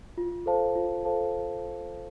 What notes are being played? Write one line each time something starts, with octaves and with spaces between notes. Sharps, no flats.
F4
A4 C5 F5 A5
F4
A4 C5 F5 A5